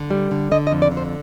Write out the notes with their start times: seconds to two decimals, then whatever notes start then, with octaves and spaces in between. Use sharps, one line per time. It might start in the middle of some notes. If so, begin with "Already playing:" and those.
Already playing: D3
0.10 G3
0.31 D3
0.51 D3 D#5
0.67 D#5
0.71 F2
0.82 D5
0.91 D3
0.97 C5